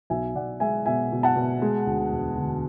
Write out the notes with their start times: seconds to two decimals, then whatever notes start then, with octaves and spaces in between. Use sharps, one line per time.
0.10 B1 E5 G#5
0.35 B1 D5 F#5
0.60 G#3 E5 G#5
0.86 B2 E5 G#5
1.12 B2
1.23 F#5 A5
1.36 B2
1.62 G#3
1.87 D2
2.12 E1
2.37 D3